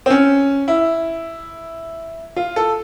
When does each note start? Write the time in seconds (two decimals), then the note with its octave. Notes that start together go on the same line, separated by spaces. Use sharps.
0.06 C4
0.10 C#4
0.68 E4
2.36 F4
2.56 A4